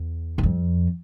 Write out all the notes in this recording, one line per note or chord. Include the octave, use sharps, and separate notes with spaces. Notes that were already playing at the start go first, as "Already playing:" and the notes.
Already playing: E2
G2
F2